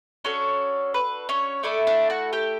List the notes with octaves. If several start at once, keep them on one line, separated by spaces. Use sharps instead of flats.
C#4 D4 F#4 A4 C#5
B4
C#4 C#5
A3 D4 E4 A4 D5
D4 D5
F#4 F#5
G4 G5